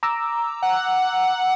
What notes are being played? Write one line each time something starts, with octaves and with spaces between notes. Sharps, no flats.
A#5 D6 E6
F#5